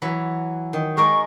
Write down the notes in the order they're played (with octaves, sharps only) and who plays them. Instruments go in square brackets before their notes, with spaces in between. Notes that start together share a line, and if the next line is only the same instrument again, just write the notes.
[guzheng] E3 F#3 B5
D#3
[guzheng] G#3 A#4 D5 [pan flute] C#6